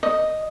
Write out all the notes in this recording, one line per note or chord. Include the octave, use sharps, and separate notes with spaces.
D#5